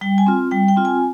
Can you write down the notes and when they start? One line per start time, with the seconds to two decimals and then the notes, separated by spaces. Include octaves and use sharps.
0.01 G3 G5
0.18 G#5
0.26 C4 F4
0.51 G3 G5
0.68 G5
0.77 C4 F4
0.85 G#5